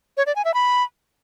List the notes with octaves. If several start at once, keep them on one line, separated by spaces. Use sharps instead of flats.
C#5
D5
G#5
E5
B5